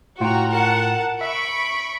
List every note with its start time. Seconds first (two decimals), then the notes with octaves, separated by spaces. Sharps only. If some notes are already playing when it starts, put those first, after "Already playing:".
0.20 A2 F4 F#4 G5 A#5
0.50 A#4 F#5 A5
1.21 E5 B5 C#6 D7